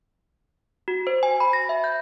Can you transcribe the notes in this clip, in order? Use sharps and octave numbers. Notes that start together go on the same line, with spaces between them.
F#4
C5
G#5
B5
A#6
E5
G6